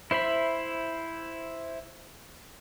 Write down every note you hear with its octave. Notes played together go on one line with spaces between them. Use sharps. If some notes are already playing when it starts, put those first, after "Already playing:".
E4 C5 E5 B5